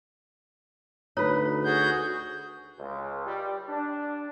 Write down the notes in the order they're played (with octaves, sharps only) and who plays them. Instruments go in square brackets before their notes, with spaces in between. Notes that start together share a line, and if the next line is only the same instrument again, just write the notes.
[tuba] D2 [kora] D#4 B4 [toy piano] C#5
[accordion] F#4 G#4 G6
[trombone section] C#2
G3
D4